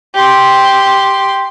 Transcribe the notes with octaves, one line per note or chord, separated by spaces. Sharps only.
G4 C6